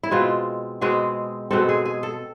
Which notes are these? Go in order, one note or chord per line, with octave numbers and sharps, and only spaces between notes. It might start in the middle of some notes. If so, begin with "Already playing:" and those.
E4
B2 G#3 C4 F4
B2 G#3 C4 G#4
B2 G#3 C4 A4
G#4
G#4
A4